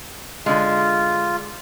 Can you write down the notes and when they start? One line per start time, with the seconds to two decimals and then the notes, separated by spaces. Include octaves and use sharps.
0.46 D3 G#3 F4